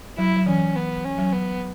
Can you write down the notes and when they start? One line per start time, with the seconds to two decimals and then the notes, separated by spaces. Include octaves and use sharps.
0.18 F#3 E4
0.37 F#3
0.46 E3 C#4
0.76 B3
1.05 C#4
1.18 F#3
1.33 B3